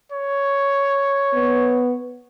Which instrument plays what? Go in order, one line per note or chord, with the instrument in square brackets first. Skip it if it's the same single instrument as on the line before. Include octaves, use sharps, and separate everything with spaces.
[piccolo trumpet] C#5
[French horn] B3